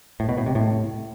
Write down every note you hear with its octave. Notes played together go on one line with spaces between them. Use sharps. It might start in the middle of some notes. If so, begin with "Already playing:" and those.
A2
B2
A2
C3
A2